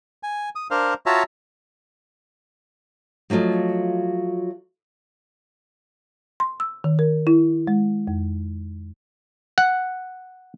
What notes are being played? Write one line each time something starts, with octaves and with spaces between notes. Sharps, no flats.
G#5
D#6
D4 A#4 C5 F5
F4 F#4 C#5 E5 A5 A#5
F3 F#3 A3 F4 D#5
C6
E6
D#3
A#4
E4
G#3
F2
F#5